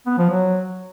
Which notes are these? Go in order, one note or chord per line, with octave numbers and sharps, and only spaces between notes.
B3
F3
F#3